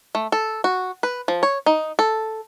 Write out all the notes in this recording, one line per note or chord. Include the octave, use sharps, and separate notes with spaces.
A3
A4
F#4
B4
F3
C#5
D#4
A4